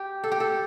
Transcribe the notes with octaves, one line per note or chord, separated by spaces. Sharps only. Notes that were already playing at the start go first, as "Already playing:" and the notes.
Already playing: G4
A4
G4
A4